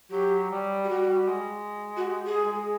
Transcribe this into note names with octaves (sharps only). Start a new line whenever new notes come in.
F#3 G4
G3
G4
G3 F#4
G3
G#3
F#4
G4
G#4
G#3